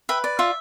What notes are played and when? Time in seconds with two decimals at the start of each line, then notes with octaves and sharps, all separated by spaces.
0.09 B4 E5 G5
0.24 D5
0.39 F4 E5